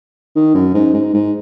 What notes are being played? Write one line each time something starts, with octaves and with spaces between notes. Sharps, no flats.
D#3
F#2
G#2
G#2
G#2